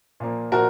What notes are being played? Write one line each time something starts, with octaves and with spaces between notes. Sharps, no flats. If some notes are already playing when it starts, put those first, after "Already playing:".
A#2 F3 A#3
A#2 F3 F#4 A#4